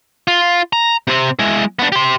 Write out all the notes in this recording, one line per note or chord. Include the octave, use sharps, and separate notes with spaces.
F4
A#5
C3 C4
G#3 E4
B3 D4
G4 C6